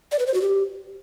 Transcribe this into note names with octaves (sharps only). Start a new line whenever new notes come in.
D5
B4
C5
F#4
G4